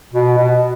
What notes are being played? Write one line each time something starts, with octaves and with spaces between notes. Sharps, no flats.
B2
B2